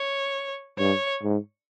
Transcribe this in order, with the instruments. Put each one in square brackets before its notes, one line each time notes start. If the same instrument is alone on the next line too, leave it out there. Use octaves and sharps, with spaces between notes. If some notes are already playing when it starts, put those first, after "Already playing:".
Already playing: [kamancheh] C#5
[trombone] G2 [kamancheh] C#5
[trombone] G#2